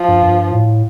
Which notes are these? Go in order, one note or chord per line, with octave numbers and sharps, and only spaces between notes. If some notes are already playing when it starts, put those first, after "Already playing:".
Already playing: F3
G2
G2
A2